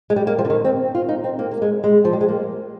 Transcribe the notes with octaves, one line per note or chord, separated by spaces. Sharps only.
G#3
G3
A#3
F3
D3
D#3
C4
F4
D#4
C4
A#3
A#3
G#3
G#3
F3
G3
G#3
A#3